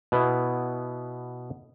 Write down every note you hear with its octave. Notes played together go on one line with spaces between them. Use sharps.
B2 B3 E4